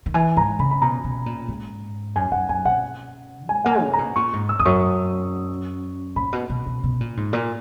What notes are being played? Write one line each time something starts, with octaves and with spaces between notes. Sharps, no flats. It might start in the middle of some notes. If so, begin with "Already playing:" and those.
D#3
E3 G#5
G#2 A#5
C#3 B5
B5
B2 A#5
B2
A#2
G#2
F#2 G#5
F#2 F#5
F#2 G#5
B2 F#5
G#3 G#5
A#3 F#5
G#5
C#3
A#5
B2
A#2 C#6
G#2
E6
E2 D#6
F#2 C#6
A#2 B5
B2
B2
B2
B2
A#2
G#2
A#2